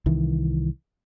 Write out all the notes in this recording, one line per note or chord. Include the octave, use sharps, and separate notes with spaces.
C2 D#3 E3